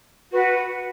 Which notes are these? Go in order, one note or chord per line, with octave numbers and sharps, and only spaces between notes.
F#4 B4 F#5